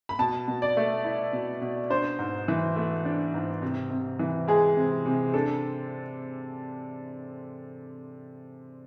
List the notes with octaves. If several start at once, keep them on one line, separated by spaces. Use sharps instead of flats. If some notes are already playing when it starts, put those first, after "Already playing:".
B5
B2 A5
B2
D5
A3
E4
B2
B2
D4 C5
G#2
E3
A3
D4
G#2
C3
C3
E3
G#3 G#4
C3
C3
D4 A4